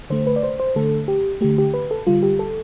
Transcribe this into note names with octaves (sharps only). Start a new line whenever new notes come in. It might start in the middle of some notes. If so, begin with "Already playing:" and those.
D3 A3 C5
B4
D5
C5
C5
D3 A3 A4
G4
D3 A3 G4
G4
B4
A4
D3 G3 F4
G4
A4